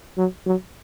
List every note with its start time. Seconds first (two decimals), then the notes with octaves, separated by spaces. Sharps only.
0.17 F#3
0.46 F#3